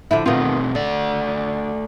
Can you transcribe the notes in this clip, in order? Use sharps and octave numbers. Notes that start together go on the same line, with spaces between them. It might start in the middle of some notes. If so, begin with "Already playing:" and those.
D3 F3 E4
B2 D#3 A3 B3 C4 F4
D3 A3 D5